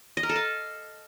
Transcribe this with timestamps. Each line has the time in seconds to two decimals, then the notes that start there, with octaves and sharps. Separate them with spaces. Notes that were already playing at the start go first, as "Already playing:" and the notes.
0.17 D#5
0.23 A#4
0.29 A4
0.36 F5